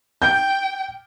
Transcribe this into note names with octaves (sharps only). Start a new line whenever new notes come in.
G5 G6